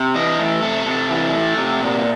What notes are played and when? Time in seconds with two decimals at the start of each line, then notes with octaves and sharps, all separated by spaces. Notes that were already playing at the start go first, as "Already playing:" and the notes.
Already playing: C3
0.15 E3 D#5
0.39 A3
0.63 C3 A4
0.86 C3
1.10 E3
1.33 A3
1.57 C3
1.80 A#2